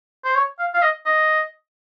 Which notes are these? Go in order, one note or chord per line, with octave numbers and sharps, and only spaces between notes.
C5
C#5
F5
F5
D#5
D#5